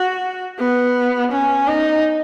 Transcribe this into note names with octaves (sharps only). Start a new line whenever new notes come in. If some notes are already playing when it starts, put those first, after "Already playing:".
Already playing: F#4
B3
C#4
D#4